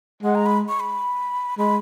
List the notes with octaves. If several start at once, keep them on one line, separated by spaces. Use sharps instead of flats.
G#3 F#5
A#5
B5
C#6
B5
G#3 B5